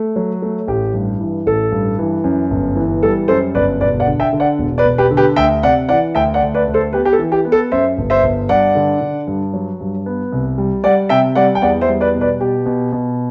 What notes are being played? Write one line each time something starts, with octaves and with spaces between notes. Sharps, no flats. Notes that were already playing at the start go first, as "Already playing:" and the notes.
Already playing: A3
F#3
A3
A1 G4
G2
E3
A1 A4
G2
E3
F#2
G1
E3
G3 A4
F#2 A4 C5
G1 B4 D5
E1 B4 D5
D5 F#5
D3
E5 G5
D3
D5 F#5
E1
B4 D5
E1
G4 B4
D3
G4 B4
D2 E5 G5
C3 D5 F#5
E3 D5 F#5
D2 E5 G5
D5 F#5
D2
B4 D5
D2
A4 C5
B3 G4 B4
G4
A4
E3
G4
B3
A4
F#2 C5 E5
G1
C5 E5
G1
G2 D5 F#5
D3
D3
G2
F#3
G2
B3
C2
G3
G3 D5 F#5
C3 E5 G5
G3 D5 F#5
G5
E2 D5 F#5
C5 E5
G3
B4 D5
B2
B4 D5
B2 G4
B2
B2